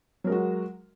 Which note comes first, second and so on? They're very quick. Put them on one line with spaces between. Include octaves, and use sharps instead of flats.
F#3 A#4 G#3 F#4